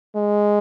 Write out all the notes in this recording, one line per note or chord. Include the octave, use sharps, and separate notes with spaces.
G#3